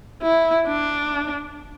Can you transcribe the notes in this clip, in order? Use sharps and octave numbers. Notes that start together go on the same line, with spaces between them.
E4
D4